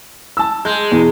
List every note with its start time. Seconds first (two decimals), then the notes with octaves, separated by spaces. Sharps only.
0.37 A5 E6
0.65 G#3 G6
0.92 E2 B2